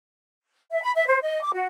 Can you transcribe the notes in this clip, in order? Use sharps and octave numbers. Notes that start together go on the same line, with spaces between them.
E5
B5
E5
C5
D#5
D6
F#4